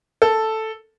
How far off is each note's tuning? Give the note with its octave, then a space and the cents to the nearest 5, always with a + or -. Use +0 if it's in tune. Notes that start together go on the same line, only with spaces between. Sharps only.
A4 +0